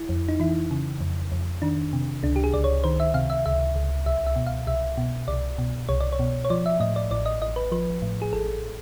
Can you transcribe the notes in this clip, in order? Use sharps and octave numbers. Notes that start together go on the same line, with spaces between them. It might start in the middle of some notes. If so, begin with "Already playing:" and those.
Already playing: E4
F2
D#4
E3 E4
C#3
F2
F2
D#3 D4
C3
C#2 D4
G4
G#4
C#2 D5
C#5
D#3 C5
E5
C3 F5
E5
C#2 E5
C#2
C2 E5
E5
B2
F5
C2 E5
B2
C2 D5
B2
C2 C#5
D5
C#5
B2
C#5
F3 D5
E5
A2 D#5
D5
A1 D5
D#5
A1 D#5
B4
F3 B4
A2
G#4
A1 A4